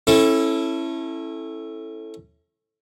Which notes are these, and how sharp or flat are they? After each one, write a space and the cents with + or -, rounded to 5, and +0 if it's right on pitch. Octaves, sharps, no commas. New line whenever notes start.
C#4 -30 E4 +0 A4 +0